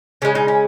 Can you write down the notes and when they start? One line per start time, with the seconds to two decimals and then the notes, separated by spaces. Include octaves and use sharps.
0.22 C#3 G#3 C#4
0.35 D#4
0.48 C#4